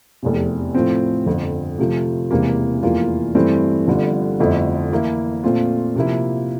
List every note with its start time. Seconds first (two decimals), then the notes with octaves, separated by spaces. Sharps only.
0.23 F1 E2 C3
0.74 A2 F3 C4
1.26 G1 F2 D3
1.79 C3 F3 A3
2.31 E1 E2 C3 E3 A#3
2.83 F1 E2 E3 A#3 F4
3.35 G2 E3 A3 C4
3.87 G1 G2 D3 F3
4.39 G1 F2 D3 A3 E4
4.91 E3 A#3 E4
5.44 A#2 A3 C4 F4
5.96 C3 F3 A#3 E4